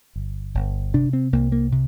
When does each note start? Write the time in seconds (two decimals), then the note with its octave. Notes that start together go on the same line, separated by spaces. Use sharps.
0.16 G1
0.55 G1
0.94 C3 D4
1.13 C4
1.33 C2 A#3
1.52 A#3
1.72 C3